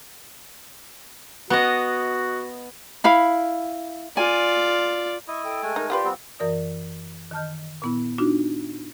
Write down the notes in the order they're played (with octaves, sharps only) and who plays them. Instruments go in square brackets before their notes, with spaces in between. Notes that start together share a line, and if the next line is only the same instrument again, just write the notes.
[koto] B3 D#5 [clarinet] F#4
[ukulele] E4 F5 B5
[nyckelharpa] F4 D5 [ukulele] G#5
[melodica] E4 D#5 [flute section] C#6
[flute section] A4 G5
[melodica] G#3 A3 G#5
[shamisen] D#4 [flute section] A#4
[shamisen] A#3 F4 B4 [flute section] G4 D5 C6
[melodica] G3 B3 C4
[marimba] F#2 E3 A#4 D5 D#6
D#3 D#5 A5 F6 G6
A#2 B3 E4
D4 D#4 F4 F#4